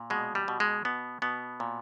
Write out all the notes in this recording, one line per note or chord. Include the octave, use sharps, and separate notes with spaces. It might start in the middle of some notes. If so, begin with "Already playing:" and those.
Already playing: A#2
B2 G#3
G3
B2
G#3
B2 B3
B2 B3
A#2